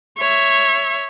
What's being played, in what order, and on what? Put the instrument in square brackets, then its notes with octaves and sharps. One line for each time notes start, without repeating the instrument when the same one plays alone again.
[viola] C#5 E5